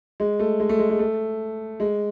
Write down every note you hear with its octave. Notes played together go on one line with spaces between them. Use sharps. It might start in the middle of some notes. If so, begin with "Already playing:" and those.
G#3
A3
G#3
A3
G#3
G#3
A3
G#3